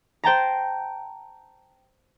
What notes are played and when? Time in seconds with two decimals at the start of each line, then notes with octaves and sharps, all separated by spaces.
0.24 C5 G5 A5 A#5